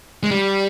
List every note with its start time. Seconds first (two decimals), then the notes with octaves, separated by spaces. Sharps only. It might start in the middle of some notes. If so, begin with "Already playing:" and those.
0.23 G#3
0.31 G3